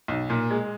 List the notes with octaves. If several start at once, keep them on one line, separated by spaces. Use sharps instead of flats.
B1
A#2
G#3